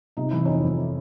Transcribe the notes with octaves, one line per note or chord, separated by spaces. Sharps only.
C3 D#4
E3 E4
F2 C#4 D#4
F2